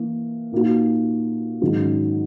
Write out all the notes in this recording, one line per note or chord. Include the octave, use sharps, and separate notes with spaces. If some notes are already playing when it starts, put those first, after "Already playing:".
Already playing: E3 A#3
A#2 A#3 D#4 F#4
G#2 D#3 F#3 C#4